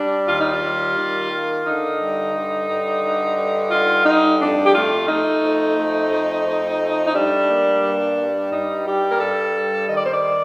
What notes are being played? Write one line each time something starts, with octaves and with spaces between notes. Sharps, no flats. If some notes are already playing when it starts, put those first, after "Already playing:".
Already playing: G3 D4
D#2 F4
D#4
F4
G3
D#3
A#3
D3 D#4
G2
D3
G2
D3
G2
D3 F4
G2 D#4
F2 D4
G4
A3 F4
A3 D#4
F2
A3
F2
F2
A3
D#4
G3 D4
A#3
G2
G3
G2 D#4
G3 G4
A#4
G2 A4
G3
D#3 D#5
D5
C5
D5